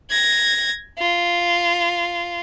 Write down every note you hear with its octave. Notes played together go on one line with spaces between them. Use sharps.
G#6 A#6
F4